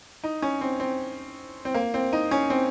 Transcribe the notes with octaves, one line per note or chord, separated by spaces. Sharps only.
D#4
C#4
C4
C4
C4
A#3
C4
D#4
C#4
C4